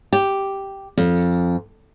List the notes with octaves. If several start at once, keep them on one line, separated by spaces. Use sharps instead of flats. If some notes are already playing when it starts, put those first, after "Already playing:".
G4
F2